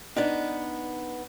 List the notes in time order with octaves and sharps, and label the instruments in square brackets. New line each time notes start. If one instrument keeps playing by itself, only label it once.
[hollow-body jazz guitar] B3 D4 D#4